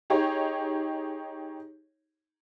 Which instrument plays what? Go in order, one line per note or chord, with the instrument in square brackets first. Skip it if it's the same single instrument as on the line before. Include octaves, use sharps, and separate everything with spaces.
[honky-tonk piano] D#4 G4 G#4 C#5